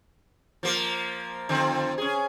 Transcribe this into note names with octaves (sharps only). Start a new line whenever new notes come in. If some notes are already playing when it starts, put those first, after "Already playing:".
F3 A#3 A#4
F2 D3 C4
C#4 G#4